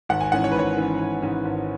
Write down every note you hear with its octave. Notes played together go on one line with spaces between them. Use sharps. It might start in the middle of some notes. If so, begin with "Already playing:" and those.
G#1 F#5
G#5
G#2 E3 C#4 F#5
C#5
B4
G#1 C#5
G#2 E3 C#4
G#1
G#2 E3 C#4
G#1